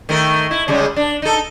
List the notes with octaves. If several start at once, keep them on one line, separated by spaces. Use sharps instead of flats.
D#3 A3 A#4
E4
C#3 G3 G#3
D4
D#4 A4